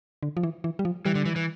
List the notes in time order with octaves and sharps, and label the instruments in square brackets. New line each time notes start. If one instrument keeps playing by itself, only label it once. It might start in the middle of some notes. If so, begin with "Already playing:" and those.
[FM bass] D3
F3
E3
E3
G3
F3
[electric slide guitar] E3 [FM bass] G3
[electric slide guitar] D3
E3
E3